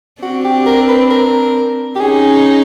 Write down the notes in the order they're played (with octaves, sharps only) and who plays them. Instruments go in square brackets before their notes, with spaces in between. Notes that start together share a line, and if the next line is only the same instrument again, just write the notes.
[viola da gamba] C4 D4 [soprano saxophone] F#4
[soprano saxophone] G4
A#4
B4
A#4
G4
[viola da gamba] C#4 D#4 [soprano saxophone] G#4